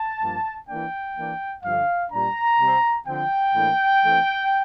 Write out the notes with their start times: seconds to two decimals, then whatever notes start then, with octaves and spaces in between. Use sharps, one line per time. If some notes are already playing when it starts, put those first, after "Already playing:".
Already playing: A5
0.20 G2 F3 A#3
0.68 E3 A#3 D4 G5
1.16 E3 A#3 D4
1.63 G2 D3 F3 F5
2.11 A#2 G3 D4 A#5
2.58 C3 G3 C4
3.06 D3 F3 C4 G5
3.53 A2 E3 A#3 D4
4.02 E3 A3 C4